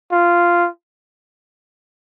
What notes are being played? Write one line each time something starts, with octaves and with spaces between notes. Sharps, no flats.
F4